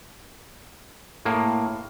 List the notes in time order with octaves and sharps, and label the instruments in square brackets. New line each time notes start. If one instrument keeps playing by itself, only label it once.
[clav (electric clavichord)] A2 A#3